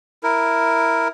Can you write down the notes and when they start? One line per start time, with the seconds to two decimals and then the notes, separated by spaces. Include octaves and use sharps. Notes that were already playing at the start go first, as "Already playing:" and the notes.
0.23 E4 A#4